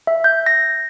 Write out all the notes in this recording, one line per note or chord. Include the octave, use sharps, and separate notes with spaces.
E5
G6
A#6